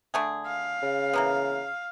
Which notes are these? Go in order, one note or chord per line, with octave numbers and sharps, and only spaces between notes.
D3 A3 G#4
F5
C#3
E3 A#3 B3